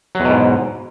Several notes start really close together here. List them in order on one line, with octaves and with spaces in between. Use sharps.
F#3 E2 B2 G#2